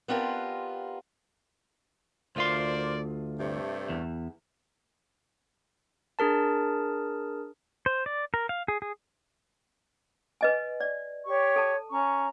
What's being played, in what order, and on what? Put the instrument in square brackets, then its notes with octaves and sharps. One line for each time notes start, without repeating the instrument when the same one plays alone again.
[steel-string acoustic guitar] B3 C4 D4 F4 G4 A#4
[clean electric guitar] D2 F4 C6 [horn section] A#4 C5 D5
[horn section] G2 C3 A3
[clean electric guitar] E2
[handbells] D4 G#4 A#4 A5
[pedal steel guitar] C5
D5
A#4
F5
G#4
G#4
[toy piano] B4 D#5 G#5
D5
[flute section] G4 C#5 C#6
[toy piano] A4 A5
[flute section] C#4 A#5 C#6